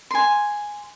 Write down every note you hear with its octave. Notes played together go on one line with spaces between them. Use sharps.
G#5 C6